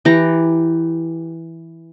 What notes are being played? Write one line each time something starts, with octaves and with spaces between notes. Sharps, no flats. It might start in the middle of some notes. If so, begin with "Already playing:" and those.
E3 G4 A#5